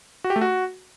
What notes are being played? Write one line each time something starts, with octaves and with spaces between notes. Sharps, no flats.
F#4
G4
A3
F#4